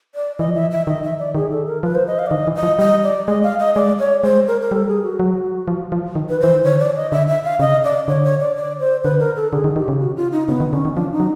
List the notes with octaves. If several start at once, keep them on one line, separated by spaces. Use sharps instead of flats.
D5
E3 D#5
F3
E3 E5
F3
E5
E3
D#3 D#5
E5
D5
D#3 G#4
A4
A#4
F3 B4
C5
D#5
F5
D5
D#3 D#5
E3
D#5
F3
G3 D#5
D5
G#3 D#5
F5
D#5
G#3 D5
C#5
G#3 C5
A#4
A#4
G3 A4
G#4
F#4
F#3
F3
F3
D#3
B4
E3 C5
D#3
D3 C#5
D5
D#5
D3 E5
E5
F5
C#3 D#5
D5
D3 C#5
C#5
D5
D5
C5
D3 B4
A#4
A4
D3 G#4
D#3
D#3 G4
C#3
F#4
F4
D#4
C#3 B3
D#3
D3 C#4
D#3
F3 D4
D#4
F#3